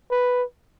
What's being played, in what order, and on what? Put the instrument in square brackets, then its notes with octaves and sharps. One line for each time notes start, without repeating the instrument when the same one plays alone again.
[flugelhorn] B4